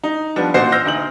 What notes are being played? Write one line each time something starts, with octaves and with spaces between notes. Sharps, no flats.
D#4
F3 G3 B3 D4
A1 A#2 F#4 C5 C7
E6 F6 G6 A#6
D2 D#4 G6 F#7